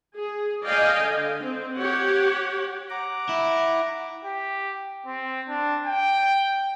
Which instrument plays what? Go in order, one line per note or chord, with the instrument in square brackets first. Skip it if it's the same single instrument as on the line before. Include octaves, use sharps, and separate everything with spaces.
[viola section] G#4
D5 D#5 F5 G5 G#5
D3
C4
G4 C#5 F#5
[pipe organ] F#5 A#5 D6
[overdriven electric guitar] E4
[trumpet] G4
C4
D4
G5